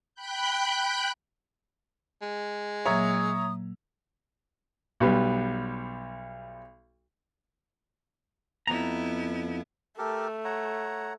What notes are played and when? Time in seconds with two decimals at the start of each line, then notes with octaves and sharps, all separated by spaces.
0.15 G5 B5 F#6 G6
2.22 G#3
2.86 A#2 F#3 A#3 C#5 E5 A#5 D#6
5.00 B1 G3 B3
8.67 F2 B3 E4 A#5
9.98 A3 G4 A4 A#4
10.45 C#5 F#5 A#5